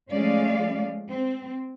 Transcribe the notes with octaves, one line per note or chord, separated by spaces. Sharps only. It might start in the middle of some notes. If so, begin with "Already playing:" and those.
F3 G#3 A3 C#4 D5 F5
C4